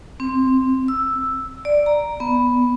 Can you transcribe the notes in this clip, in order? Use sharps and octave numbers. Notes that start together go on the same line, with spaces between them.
C4
E6
D5
A#5
B3